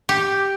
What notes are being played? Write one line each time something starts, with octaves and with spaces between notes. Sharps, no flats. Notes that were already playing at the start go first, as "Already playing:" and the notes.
G4